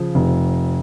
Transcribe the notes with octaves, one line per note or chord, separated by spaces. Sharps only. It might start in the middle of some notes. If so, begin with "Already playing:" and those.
Already playing: C#3 F3
F1